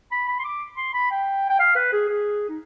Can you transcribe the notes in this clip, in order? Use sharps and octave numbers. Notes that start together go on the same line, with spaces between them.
B5
B5
C6
D6
C6
B5
G5
G5
F5
B4
G#4
G#4
D#4